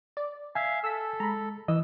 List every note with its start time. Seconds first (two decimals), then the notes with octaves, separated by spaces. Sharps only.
0.17 D5
0.55 E5 F5 G#5 G#6
0.84 A4 E6 B6
1.20 G#3 A#5 B5
1.68 E3 D#5 E6